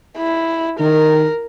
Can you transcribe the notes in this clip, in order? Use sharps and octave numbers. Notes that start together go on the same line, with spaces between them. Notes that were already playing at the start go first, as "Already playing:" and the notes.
E4
D#3 A#4